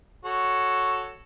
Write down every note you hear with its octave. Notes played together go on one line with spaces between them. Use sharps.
F#4 A4 C#5